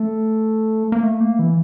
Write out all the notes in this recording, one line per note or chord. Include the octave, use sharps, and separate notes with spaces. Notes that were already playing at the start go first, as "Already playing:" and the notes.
Already playing: A3
A#3
A3
A#3
E3